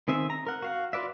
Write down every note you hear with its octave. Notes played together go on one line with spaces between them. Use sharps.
D#3 C4 G#4 E5
A#5
A#4 F#5
F#4 F5 F#5
F4 F#4 B4 D5 E5